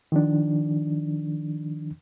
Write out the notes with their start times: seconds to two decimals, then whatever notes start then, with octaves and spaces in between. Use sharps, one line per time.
0.12 D#3 F3 D4